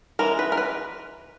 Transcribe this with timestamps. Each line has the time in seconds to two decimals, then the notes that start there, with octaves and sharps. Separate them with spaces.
0.19 E3 G#3 C#4 A#4
0.39 B4
0.52 A#4
0.57 B4